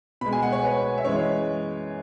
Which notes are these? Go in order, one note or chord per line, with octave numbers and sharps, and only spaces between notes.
B2 G#3 B5
G#5
F#5
C#5
B4
C#5
E5
F#2 E3 G#3 C#5